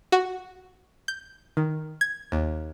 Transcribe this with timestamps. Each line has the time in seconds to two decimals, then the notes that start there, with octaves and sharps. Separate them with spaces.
0.12 F#4
1.08 G6
1.57 D#3
2.01 G#6
2.32 D#2